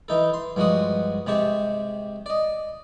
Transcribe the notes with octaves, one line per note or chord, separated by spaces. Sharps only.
E3 D#4 A4
C6
G2 F3 G#3 F#4 F#5 D#6
C3 G#3 G4 A5 C#6
D5 D#5